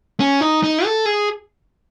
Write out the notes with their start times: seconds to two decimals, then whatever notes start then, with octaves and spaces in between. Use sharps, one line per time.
0.20 C#4
0.41 D#4
0.63 D#4
0.85 A4
1.06 G#4